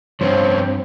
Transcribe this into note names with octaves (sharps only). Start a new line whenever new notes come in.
G2 F3 B3 C4 C5 C#5